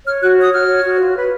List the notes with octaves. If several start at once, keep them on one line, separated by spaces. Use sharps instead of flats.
C#5 F6
F#4 F#6
C#5 D#6
F#4 F6
C#5
F#4
F4
B4